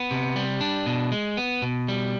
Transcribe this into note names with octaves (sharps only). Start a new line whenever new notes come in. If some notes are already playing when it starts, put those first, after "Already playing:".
Already playing: B3
C3
G3
D4
B2
G#3
B3
B2
G3